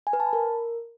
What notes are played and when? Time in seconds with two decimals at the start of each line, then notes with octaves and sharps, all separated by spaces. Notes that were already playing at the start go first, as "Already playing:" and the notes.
0.07 G#5
0.13 B4
0.20 A5
0.26 B5
0.33 A#4